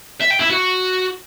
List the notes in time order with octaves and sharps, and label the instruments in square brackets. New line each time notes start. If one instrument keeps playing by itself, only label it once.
[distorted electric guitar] E5
G5
E4
F#4